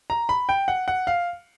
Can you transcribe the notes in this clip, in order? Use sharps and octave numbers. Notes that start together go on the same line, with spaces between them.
A#5
B5
G5
F#5
F#5
F5